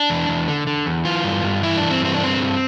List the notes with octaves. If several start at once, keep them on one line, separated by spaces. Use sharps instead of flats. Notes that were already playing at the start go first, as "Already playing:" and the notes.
Already playing: D4
E2
E2
D3
D3
E2
E3 F4
G2
G2
E3 E4
E3 D4
C4
G2 C4
D4
D3 C4
G2